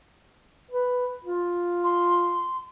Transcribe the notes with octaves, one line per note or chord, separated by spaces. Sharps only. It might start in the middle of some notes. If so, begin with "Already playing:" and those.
B4
F4
C6